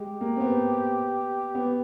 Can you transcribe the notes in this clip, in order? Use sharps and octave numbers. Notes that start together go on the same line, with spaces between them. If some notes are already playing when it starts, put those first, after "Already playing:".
Already playing: G#3 G4
A#3
C4
B3
B3